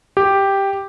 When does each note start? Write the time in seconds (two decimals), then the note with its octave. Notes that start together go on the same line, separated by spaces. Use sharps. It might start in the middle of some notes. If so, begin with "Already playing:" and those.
0.17 G4